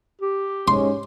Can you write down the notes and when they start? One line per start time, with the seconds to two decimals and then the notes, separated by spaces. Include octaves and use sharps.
0.21 G4
0.68 G#2 G#3 C#4 C6